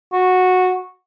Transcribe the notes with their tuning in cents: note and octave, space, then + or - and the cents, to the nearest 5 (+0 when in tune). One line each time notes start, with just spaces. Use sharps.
F#4 -10